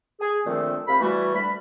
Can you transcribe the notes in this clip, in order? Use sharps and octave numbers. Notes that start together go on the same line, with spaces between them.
G#4
A#2 D3 D#3 F3 A3 C4
C2 F3 C4 F5 B5
E3 G3 A3 F#4
D2 G3 B5